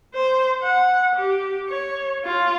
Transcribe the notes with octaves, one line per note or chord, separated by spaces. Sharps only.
C5
F#5
G4
C#5
F4